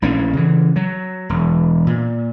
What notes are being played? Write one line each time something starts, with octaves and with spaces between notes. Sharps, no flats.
A#1 A2 A#3 C#4
C#3 E3
F#3
E1
A#2